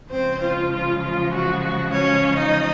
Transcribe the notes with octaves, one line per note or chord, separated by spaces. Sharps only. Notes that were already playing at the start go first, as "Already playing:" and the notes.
C#3 F3 G#3 C4 C5
F4
F4
F4
F#4
F#4
C#4 C#5
D#4 D#5